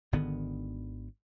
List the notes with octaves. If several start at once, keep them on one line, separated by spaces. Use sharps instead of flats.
G#1 D3 D#3 B3